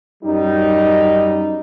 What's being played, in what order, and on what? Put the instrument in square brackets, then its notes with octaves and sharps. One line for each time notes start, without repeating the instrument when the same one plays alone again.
[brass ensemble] F#2 G3 D#4